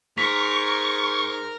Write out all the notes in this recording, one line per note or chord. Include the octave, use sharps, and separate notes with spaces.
G#2 A#4 C#6 B6